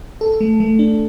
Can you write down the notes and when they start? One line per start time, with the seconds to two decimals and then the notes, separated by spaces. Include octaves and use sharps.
0.21 A4
0.41 A3
0.60 A3
0.79 D4